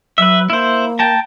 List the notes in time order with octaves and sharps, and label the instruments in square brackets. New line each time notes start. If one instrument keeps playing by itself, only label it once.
[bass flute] F#3 [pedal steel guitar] B4 E5
[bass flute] A#3 [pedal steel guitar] E4 C5
[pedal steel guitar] G5 A5 A#5